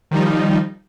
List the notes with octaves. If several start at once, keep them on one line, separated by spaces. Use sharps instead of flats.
D#3 F3 G3 D#4